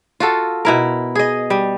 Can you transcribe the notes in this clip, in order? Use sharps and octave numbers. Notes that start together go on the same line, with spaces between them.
F4 F#4 A4
B2 E4 A#4
G#4 D#5
G3